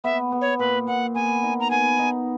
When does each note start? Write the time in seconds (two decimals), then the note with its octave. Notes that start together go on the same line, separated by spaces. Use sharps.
0.04 B3 E5
0.32 B3
0.41 C#5
0.59 A#2 B4
0.87 A#2 F#5
1.15 B3 G#5
1.43 D#4
1.60 A#5
1.71 B3 G#5
1.99 D#4